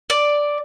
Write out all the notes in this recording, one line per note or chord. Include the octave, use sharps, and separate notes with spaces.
D5